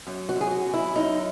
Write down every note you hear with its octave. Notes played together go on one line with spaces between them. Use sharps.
F#2
F#4
F#2
G#4
F#4
F#2
E4
F#2 D#4